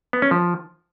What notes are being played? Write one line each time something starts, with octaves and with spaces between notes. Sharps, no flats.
B3
C#4
F3